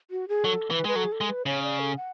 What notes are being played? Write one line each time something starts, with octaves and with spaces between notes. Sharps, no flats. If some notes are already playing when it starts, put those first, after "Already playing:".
F#4
G#4
F#3 A4
E3 B4
G#3 B4
F#3 A4
G#4
A4
G#3
B4
C#3 C#5
D5
A4
F#5